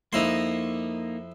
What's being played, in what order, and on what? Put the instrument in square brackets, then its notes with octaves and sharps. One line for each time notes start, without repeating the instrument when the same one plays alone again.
[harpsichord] F2 E4 C6 [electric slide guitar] A#3 D#4